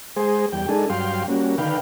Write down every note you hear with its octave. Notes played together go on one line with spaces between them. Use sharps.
G#3 G#4 C5
E2 G3 G5
G#3 D4 D#4 G#4 A4
G2 F#3 F5 G5 C6
G3 A#3 C#4 F#4
D3 D#3 B4 F5 G5